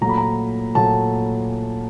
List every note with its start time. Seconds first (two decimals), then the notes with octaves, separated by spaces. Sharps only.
0.01 A#2 F#3 A3 A#5
0.09 B5
0.18 A#5
0.75 A#2 F#3 A3 A5